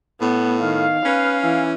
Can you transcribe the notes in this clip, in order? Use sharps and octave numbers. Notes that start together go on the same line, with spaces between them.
A2 B3
D#3 F5
C#4 B4
E3